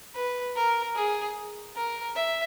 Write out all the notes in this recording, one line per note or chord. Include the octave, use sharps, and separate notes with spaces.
B4
A#4
G#4
A#4
E5